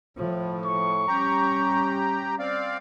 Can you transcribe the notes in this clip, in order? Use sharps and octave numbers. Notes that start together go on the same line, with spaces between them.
A2 F3
C#6
G3 C#4 G4 A#5
C4 D5 F5